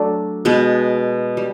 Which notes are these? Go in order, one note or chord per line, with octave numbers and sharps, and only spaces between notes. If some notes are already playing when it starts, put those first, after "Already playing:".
Already playing: F#3 A3 D4
B2 G#3 B3
G3